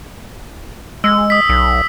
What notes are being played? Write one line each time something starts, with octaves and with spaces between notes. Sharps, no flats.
G#3 E6
D#6 B6
B1